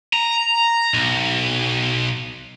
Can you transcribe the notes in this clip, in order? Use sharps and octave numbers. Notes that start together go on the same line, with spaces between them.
A#5
B1